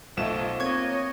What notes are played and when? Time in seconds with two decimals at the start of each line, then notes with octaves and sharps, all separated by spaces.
0.17 B1 F3 A3 E7
0.59 A#3 C4 C#5 D#5 C#6 G#6